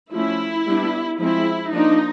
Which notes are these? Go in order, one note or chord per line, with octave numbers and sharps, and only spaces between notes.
F3 A3 C#4 E4
G3 B3 D4
F3 G#3 C4 E4
F3 A#3 D4 D#4